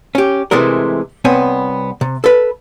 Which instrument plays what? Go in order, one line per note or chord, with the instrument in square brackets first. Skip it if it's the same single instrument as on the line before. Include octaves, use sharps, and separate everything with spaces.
[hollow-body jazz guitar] C#4 G4
C3 E3 G#3 A3 A#4
C2 B3 C4 C#5 G#5
C3
A4 B4